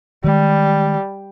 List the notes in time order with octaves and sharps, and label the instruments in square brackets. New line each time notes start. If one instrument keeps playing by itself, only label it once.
[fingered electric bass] D#3 G#3 [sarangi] G3